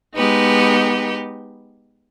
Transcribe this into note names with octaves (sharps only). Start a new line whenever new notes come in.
G#3 B3 D#4 G4 B4